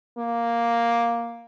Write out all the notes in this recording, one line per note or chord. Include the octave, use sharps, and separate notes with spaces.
A#3